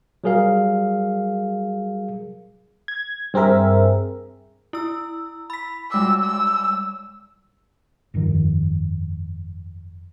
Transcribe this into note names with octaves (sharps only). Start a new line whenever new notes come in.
F#3 G3 G#4 A#4 F5
G#6
G2 C4 G#4 A#4 E5
E4 E6
B5 B6
G3 G#3 D6 E6
E6
G1 F2 B2 D#3